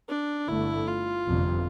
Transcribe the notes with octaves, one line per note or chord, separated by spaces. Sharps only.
D4
G1 G2 D3 A3 E4
F4
G1 F2 C3